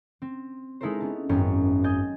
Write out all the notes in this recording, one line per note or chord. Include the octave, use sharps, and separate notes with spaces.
C4
G#3 D#4 E4 A4 A#4 C5
B3 C#4 A5
G#1 F#2 B3 C#4 G5 C#6
D#5 G#5 G6 A6